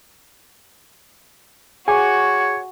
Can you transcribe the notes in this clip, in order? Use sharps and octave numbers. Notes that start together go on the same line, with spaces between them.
F#4 G#4 C#5 G#5 D6